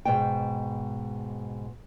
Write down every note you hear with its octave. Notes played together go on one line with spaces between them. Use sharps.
G#2 B2 G5